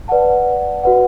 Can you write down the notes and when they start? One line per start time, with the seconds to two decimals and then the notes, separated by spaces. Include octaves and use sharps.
0.08 B4 D5 F#5 A5
0.83 F#4 B4 F#5